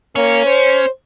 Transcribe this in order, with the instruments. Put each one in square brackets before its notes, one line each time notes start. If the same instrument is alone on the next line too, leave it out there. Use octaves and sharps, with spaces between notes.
[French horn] A#3 [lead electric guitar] C#4 [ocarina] C#5
[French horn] C5